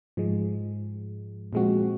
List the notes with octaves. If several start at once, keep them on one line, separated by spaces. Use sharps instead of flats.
G#2 F3 G#3
A#2 F3 G#3 C4 F#4